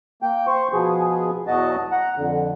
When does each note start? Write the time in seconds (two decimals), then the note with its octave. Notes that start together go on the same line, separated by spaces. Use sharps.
0.22 A#3 G5
0.47 C5 C#6
0.73 B2 F3 B3 G#4
1.47 E2 B2 F#3 F#4 D#5 A5
1.92 F#5 A#5
2.17 F2 D3